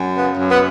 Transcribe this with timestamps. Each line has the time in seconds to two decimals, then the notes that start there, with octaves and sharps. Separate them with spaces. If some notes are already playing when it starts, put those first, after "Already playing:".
Already playing: F#2
0.15 C#3 B3
0.38 F#2
0.50 B3